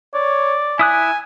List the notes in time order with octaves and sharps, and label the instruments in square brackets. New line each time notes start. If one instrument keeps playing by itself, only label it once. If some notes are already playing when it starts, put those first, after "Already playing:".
[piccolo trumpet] C#5 [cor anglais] D5
[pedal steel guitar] E4 D#6 F#6 [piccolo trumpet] G#5